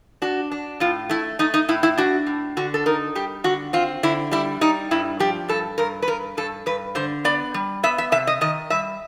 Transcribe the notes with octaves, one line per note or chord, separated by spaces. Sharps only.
D4 F#4
D4
A2 F4
A3 E4
A3 D#4
D#4
A2 E4
E4
D4 F#4
A2
D3 F#4
A4
D#4 A#4
G3 G4
D3 F#4
C4 F4
D3 E4
G3 E4
G3 D#4
G2 E4
F3 G4
G2 A4
G2 A#4
B4
G2 A#4
G2 A4
G2 B4
D3 C5
B3 D5
G3
B3 E5
E5
C3 E5
D#5
D#3 D#5
G3 E5